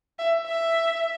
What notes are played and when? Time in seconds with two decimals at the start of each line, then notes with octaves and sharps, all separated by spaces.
0.19 E5
0.46 E5